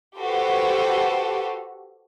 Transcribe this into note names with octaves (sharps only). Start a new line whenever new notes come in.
F#4 G4 A4 B4 C5